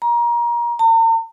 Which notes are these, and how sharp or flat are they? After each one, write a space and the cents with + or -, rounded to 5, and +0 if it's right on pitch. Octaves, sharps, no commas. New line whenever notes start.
A#5 +25
A#5 -45